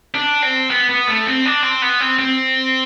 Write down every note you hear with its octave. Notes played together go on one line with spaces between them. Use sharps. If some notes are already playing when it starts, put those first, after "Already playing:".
D4
C4
B3
B3
A3
C4
D4
C4
B3
C4
C4